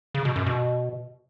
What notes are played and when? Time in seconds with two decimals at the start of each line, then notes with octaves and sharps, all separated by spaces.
0.14 C#3
0.25 B2
0.36 F#2
0.46 B2